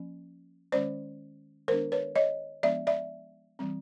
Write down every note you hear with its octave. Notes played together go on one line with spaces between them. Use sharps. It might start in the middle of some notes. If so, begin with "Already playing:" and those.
Already playing: F3 A#3 C#4
D#3 G#3 C#4 C5 D5
D#3 G#3 B3 D4 A#4 C5
B4 C#5
C#5 D#5
F3 G#3 B3 D4 D5 E5
D5 E5
E3 G3 C4